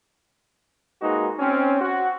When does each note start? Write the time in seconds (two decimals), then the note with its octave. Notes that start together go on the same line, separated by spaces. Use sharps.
1.02 A#2 G#3 D#4 F#4 B4
1.40 C4 C#4
1.81 F#4